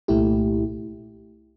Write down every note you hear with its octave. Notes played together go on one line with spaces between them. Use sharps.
C2 A#2 A3 E4 G4